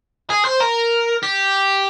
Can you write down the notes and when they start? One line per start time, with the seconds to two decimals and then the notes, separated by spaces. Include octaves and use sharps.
0.30 G#4
0.45 C5
0.60 A#4
1.23 G4